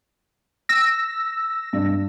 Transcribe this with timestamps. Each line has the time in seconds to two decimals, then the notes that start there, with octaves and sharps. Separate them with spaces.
0.69 E6 A#6
1.73 G2